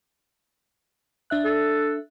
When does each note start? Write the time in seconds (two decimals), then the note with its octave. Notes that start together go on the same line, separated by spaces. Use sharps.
1.30 D4 E5 F#6
1.44 A4